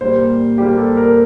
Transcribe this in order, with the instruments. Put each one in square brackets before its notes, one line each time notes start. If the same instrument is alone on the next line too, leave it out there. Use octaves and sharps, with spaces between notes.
[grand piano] A#2 G3 A#3 C5
A#2 G3 A#3 G4
A4
A#4